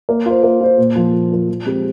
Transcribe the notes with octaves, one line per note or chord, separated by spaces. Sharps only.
A#3
F4 C5
A#3
F4 C5
A#2
F3 A#3 F4
A#2
F3 A#3 F4
F3
G#3 C4 G4